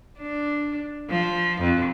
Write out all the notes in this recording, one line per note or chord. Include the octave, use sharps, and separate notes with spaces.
D4
F3
F2